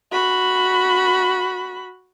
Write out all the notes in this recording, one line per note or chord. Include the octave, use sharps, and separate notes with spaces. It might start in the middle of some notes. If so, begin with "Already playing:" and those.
F#4 B5